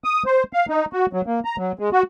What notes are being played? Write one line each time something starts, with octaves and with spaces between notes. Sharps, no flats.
D#6
C5
F5
D#4
F#4
F#3
A#3
A#5
F#3
G#3
F#4